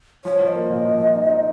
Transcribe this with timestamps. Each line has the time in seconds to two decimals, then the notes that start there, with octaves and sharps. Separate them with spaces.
0.25 F3 C#5
0.40 F3
0.47 D#5
0.55 A#3
0.70 A#2
0.85 F3
1.00 F3
1.15 D#4
1.30 D#4